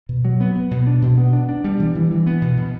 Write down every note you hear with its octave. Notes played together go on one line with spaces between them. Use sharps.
B2
F#3
B3
B3
B2
D4
B2
B3
D4
D4
G3
E3
E3
E3
B3
B2
B2